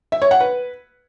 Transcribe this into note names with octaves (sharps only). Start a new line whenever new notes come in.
E5
C#5
F#5
B4